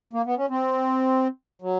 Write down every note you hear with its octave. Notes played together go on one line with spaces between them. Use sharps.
A#3
B3
C#4
C4
F#3